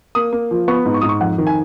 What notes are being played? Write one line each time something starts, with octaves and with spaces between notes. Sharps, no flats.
A#3 D#6
A#3
F3
B3 C#6
G#2
C#6
G#2 D#6
C#6
F2 F#5
D#3
G#5